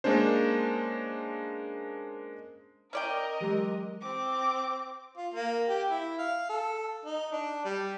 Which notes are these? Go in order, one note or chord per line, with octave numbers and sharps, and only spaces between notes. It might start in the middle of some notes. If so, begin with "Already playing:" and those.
G#3 A#3 C#4 D4 C5
C#4 A#4 D5 D#5 G5
E3 F#3 G#3 G4
C4 D6
F4
A#3
G4
E4
F5
A4
D#4
D4
G3